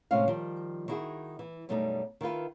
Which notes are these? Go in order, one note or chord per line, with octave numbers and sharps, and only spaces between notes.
A2 C3 G#3 C#4 F5
D#3 F3 G3
D#3 D#4 E4 F#4 G#4
E3
F#2 B2 G3 A3 B3 D#4
D#3 E4 F4 B4